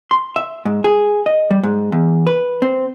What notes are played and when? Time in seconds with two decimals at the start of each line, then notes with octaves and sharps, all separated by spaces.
0.11 C6
0.36 E5
0.65 G#2
0.84 G#4
1.26 D#5
1.51 G3
1.63 G#2
1.92 E2
2.27 B4
2.62 C4